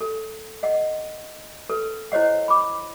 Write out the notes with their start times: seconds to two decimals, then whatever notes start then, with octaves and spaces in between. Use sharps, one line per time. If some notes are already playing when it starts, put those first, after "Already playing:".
0.01 A4
0.63 D#5 F#5
1.70 A4 B4
2.12 E4 C5 C#5 D#5 F#5
2.48 B5 D6